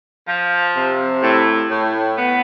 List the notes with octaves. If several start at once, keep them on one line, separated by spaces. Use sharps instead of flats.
F3
C3
A2
A2
B3